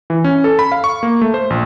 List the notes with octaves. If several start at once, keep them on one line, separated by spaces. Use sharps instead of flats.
E3
C#4
A4
B5
F5
C#6
A#3
A3
C5
A#1